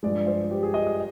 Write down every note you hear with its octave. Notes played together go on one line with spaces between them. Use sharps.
G2 F3 G#3 D5
C5
G4
G#4
D#5
D#5